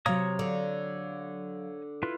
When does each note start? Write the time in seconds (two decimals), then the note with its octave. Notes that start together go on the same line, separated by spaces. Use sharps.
0.06 C3 F#3 C#5 F5 A#5 D#6
0.39 D3
2.03 E4 F4 B4